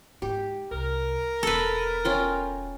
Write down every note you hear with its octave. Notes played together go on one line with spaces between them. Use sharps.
G#2 G4
C2 A#4
E1 B3 A4 B4
C#4 F4 G5